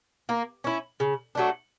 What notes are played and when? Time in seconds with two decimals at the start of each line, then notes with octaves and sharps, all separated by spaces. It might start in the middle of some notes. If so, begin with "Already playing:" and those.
0.29 A#3
0.64 C#4 E4
1.00 C#3
1.35 F#3 A3 D4